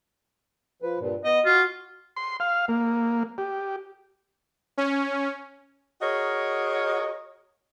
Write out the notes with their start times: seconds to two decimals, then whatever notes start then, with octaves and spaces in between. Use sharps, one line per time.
0.82 F3 B4
0.99 G2 A#2
1.24 B3 D#5
1.45 F4 F#4
2.16 C6
2.40 F5
2.68 A#3
3.38 G4
4.78 C#4
6.01 F#4 G#4 A#4 C#5 D#5